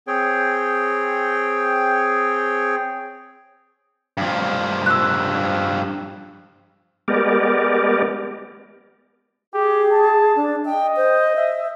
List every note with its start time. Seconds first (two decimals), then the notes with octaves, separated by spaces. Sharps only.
0.07 C4 G#4 C#5 G5
4.17 G2 F3
4.86 E6 F#6
7.08 G#3 B3 G4 A#4 D5
9.54 G4 G#4
9.92 A5
10.36 D4
10.65 D#5 G5
10.97 C5
11.36 E5